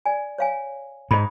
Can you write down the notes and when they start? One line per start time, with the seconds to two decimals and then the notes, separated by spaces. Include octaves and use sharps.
0.06 D5 G#5
0.38 C#5 F5 G#5
1.11 G#2 D#5 B5